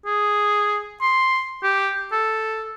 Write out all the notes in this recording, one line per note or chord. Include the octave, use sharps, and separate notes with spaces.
G#4
C6
G4
A4